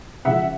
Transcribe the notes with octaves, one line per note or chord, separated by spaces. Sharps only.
C#3 F3 G#3 E5 F#5